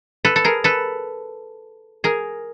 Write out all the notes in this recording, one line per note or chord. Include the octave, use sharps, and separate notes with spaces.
A4 B4
A4
G#4 A#4
A4 B4
G#4 A#4